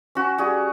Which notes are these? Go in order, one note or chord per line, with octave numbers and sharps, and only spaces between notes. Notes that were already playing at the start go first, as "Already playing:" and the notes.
C#4 F#4
G3 F#4 G#4